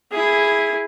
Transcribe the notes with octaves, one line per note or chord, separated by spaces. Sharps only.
E4 G#4